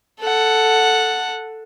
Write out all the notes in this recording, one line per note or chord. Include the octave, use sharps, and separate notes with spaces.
A4 F#5